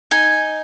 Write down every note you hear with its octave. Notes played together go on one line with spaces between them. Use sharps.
D#4 G#5